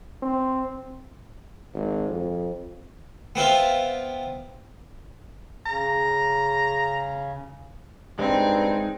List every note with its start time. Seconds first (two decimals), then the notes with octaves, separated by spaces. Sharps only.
0.23 C4
1.74 G#1
2.09 F2
3.35 B3 C4 E4 F4
5.66 C#3 A#5
8.19 G2 G#3 C4 D#4